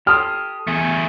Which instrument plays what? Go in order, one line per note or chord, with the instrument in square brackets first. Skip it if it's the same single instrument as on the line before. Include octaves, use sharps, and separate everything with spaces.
[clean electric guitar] G4 A4 [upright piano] C6 D#6 F6
[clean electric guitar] E2 [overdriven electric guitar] A3 G#4